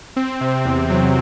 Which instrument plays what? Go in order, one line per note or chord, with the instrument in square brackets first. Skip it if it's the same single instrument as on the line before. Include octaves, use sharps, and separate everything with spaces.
[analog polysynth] C4
C3
E2
F#3